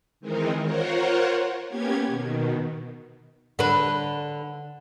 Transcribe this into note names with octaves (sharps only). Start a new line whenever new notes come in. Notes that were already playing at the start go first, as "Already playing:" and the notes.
D#3 E3 G#3 C4 D#4 A#4
F4 A#4 C5 C#5 F#5
A#3 B3 C#4 G4 G#6
B2 D#3
D3 B4